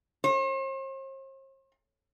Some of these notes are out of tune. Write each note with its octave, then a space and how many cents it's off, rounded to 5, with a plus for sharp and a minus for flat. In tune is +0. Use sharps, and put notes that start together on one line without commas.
C5 +45